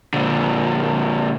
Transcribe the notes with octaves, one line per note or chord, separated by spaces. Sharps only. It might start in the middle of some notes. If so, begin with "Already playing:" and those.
A#2 D3